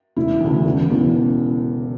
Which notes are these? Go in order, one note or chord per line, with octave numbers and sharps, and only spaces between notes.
E1 E4
D2 C#3 E3
E1
E2 C#3